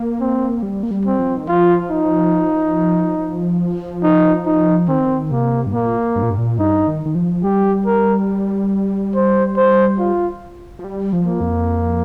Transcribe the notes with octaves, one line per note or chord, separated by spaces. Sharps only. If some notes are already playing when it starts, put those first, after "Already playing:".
Already playing: A#3
C4
G3
A#3
G3
C4
F3
D#3
F3 F4
D#4
F3
D#4
D#4
D#3 C4
C3 A#3
G2
A#2 A#3
G2
A#2
G2
A#2
G2 D#4
D#3
D#3
F3
G3 G4
A#4
C5
C5
F4
F3
G3
F3
A#3
F2